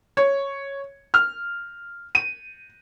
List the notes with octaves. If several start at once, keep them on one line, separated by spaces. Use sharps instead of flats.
C#5
F6
D#7